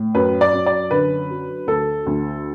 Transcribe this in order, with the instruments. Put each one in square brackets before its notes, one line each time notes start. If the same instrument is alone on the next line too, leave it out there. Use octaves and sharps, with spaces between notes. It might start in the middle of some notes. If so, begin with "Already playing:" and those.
Already playing: [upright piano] A2
F#2 B4
D5
F#2
D5
D3 B4
F#3
D2 A4
D2